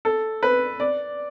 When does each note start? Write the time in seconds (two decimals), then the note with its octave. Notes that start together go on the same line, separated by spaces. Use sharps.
0.05 A4
0.43 B4
0.80 D5